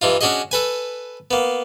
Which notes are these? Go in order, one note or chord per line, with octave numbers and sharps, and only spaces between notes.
G2 E3 D#4 F4
C#4 D4 F#4 G#4 D#5
A4 B4 G#5
A#3 B3